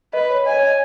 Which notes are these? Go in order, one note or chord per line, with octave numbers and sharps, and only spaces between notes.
B4 D#5
C#5
D#5 G#5
C#5
D#5